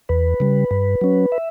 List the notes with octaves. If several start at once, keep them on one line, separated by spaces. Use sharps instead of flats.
E2 B4
C#3 G3
G2
F#3 C#4
E5